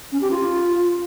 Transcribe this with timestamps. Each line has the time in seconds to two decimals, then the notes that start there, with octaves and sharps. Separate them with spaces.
0.12 C#4
0.21 G4
0.30 F4